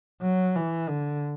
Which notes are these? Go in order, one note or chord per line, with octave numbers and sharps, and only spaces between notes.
F#3
E3
D3